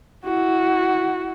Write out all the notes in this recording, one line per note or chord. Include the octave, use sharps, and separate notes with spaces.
E4 F#4